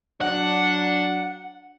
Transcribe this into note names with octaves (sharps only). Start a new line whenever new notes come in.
F#3 D4 F#5